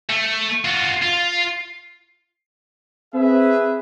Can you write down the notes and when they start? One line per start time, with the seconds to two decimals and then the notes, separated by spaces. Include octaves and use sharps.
0.10 A3
0.64 F4 F#4
1.03 F4
3.14 C4 G#4 B4 E5